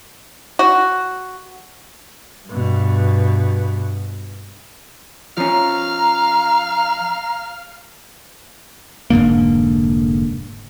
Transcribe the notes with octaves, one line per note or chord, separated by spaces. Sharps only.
F#4
G2 B2
F3 C#4 F5 A#5
F1 G#2 D3 A#3